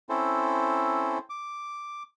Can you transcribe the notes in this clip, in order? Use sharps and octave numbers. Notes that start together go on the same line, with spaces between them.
C4 C#4 E4 A4 C5
D6